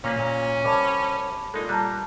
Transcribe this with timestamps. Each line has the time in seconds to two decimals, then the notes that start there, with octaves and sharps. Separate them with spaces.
0.04 A#2 A#3 C#4 B4
0.19 A#2
0.64 C2 A5 B5 D6
1.54 A#2 G#3 D#4 A4
1.69 G3 A5 A#5 F#6